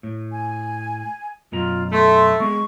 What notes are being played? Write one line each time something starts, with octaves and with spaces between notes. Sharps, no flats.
A2
G#5
F#2 B2 F4 A#5
A3 C6
G#3 B3 G#4 C#6